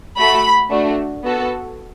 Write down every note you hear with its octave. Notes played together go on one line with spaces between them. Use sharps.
A3 F#4 A4 B5
A3 D4 F#4
B3 F#4 A4